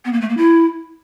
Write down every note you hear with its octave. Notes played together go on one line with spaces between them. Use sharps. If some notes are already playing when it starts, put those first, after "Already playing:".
B3
A#3
A3
A#3
E4